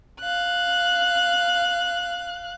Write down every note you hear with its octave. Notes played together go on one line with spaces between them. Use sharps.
F5 F#6